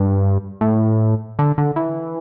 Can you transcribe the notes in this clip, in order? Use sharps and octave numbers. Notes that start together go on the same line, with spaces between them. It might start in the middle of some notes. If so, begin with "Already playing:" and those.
Already playing: G2
A2
D3
D3
E3